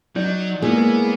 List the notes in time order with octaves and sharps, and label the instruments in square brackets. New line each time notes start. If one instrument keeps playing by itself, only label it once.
[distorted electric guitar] F#3 [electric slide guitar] D#4 D5
[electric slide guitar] G#3 E4 C#5 [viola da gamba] A#3 [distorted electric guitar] B3 [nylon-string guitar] G#4